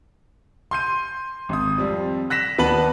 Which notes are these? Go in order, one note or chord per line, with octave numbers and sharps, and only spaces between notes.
C6 G6 D#7
G#1 D#6
F2 G3 C4
F#6 A#6 B6 E7
D#2 B3 D4 B4 A5 F#7